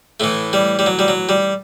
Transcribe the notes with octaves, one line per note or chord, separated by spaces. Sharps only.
A2 E3 A3
G3
G3
F#3
G3
F#3
G3